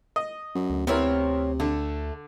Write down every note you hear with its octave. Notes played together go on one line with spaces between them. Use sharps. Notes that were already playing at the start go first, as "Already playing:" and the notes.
D#5
F#2
D2
C3 B3 C4 E4 A#4 C5 C#5
D3 A3